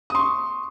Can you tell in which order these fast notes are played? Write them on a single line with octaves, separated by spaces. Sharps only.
D#6 C6 C#6